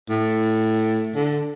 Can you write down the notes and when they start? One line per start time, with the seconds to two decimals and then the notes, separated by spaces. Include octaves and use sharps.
0.10 A2
1.15 D3